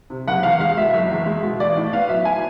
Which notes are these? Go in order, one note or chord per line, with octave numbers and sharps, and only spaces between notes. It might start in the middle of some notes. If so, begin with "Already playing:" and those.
C3
F#1 F#5
E2 F5
G#3 F5
B2 E5
F#1 E5
E2
G#3
B2
A1 D5
A2
B3 F5
F#3 E5
G#5